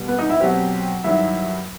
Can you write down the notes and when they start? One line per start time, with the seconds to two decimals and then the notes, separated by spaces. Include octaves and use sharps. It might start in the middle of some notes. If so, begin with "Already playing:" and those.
Already playing: B2 G3
0.08 B3 B4
0.19 D#4 D#5
0.29 E4 E5
0.40 B2 F#3 C4 G4 G5
1.04 G2 D#3 F#3 E4 E5